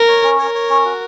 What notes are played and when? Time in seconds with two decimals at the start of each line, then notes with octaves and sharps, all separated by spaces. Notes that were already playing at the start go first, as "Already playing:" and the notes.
Already playing: A#4
0.08 C#5
0.24 C#4
0.39 A#4 C#5
0.55 C#5
0.70 C#4
0.85 F#4